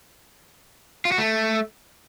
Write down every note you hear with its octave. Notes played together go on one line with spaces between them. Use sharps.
F4
F#4
A3